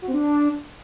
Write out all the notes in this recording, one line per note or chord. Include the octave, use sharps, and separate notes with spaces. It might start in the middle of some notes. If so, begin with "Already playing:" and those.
F#4
C4
D4